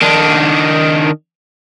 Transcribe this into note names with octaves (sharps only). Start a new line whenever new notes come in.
D#3 D4